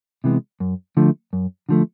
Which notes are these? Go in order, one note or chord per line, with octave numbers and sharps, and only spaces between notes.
C3 E3 G#3 B3
F#2
D3 F3 A3
F#2
D3 F3 A3